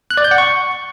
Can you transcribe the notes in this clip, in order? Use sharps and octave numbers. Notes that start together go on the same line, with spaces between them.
F#6
D5
G6
F#5
C#6